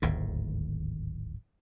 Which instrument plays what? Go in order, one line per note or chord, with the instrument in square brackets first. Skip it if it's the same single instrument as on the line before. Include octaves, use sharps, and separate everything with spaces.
[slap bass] D1 G#1 D#2 A2